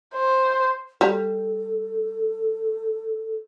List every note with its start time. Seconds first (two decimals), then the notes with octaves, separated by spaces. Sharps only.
0.15 C5
1.01 G3 A4